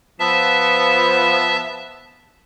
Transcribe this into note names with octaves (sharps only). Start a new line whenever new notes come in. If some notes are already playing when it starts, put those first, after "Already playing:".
F3 B3 E5 A5